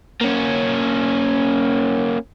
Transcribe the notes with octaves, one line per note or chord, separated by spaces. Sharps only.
A#3 C#4